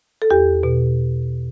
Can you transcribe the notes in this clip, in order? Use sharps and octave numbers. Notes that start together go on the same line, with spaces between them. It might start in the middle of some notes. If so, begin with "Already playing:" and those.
A4
E2 G4
B2